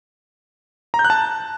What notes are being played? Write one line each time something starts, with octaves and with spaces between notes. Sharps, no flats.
A#5
G6
F#6
A5